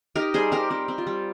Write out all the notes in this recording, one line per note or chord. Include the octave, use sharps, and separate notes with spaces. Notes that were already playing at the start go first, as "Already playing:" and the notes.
D#4 G4 A#4
G3 G#4 C5
G3 G4 A#4
C4 G4
C4
F4
G3